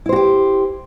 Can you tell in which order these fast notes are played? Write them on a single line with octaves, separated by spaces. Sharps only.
E4 C5 F#4 G4